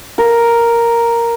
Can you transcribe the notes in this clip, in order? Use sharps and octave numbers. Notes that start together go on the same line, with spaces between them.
A#4